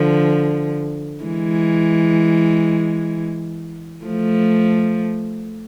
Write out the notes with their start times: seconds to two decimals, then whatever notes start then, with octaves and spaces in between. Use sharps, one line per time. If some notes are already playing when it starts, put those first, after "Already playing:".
Already playing: D3 F3
1.24 E3 G#3
4.05 F3 A3